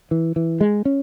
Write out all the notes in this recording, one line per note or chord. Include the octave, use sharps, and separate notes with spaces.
E3
E3
G#3
C#4